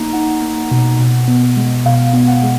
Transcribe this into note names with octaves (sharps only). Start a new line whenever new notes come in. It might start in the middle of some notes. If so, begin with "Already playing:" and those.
Already playing: A#3 D#4 A#5
D#4 F#5
A#3
B2
B2
B3
G#3
B2 F5
B3
F#5
G#3